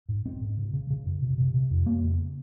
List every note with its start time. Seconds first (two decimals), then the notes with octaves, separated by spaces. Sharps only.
0.09 G#2
0.26 G#2 C4
0.41 G#2
0.57 C#3
0.73 C#3
0.90 C#3
1.06 F#2
1.22 C3
1.38 C3
1.54 C3
1.70 F2
1.86 F2 A#3
2.03 C#3